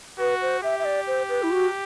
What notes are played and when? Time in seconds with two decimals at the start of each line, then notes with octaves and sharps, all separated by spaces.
0.19 F#4 B4
0.42 C5
0.62 G4 E5
0.79 E5
0.85 D5
1.07 C5
1.29 B4
1.43 E4
1.51 F#4